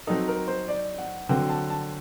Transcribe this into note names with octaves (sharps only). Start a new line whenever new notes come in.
F#3 C4 D#4 A4
A#4
C5
D5
F#5
D3 F#3 C4 G5
A5
A5